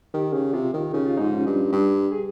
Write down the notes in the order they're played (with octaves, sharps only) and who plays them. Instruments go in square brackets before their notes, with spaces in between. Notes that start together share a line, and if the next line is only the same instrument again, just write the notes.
[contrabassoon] D#3 [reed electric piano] G4
[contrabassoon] C#3
[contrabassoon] C3 [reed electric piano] F4
[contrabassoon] D#3
[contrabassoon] C#3 [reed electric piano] D#4
[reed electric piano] F4
[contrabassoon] G#2 [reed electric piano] D#4
[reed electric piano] C#4
[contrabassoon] G2
[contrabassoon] G2 [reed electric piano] G4
[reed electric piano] G#4